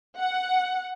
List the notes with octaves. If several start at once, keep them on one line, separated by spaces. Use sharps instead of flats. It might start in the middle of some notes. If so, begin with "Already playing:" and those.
F#5